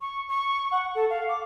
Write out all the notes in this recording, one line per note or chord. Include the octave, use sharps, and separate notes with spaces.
C#6
C#6
F#5
A4
F5
D6